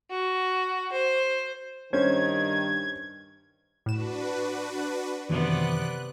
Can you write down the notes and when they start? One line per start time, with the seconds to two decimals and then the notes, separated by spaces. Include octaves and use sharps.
0.10 F#4
0.92 C5
1.93 G2 D#3 C#4 C5 G#6
3.86 A2 D4 F#4 B4 E7
5.29 F#2 C3 D#3 E3 B3 D5 F#6